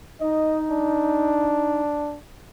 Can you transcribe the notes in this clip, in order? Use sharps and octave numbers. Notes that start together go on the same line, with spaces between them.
D#4 D#5
D4